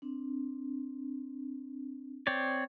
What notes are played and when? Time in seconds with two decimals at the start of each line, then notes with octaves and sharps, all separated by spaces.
0.02 C4 D4
2.27 C4 C#5 D5